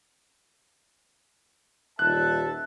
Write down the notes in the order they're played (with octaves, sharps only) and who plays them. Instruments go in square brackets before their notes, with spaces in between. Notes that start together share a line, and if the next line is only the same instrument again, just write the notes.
[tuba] D#1 [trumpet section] A4 E5 A5 [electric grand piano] F#6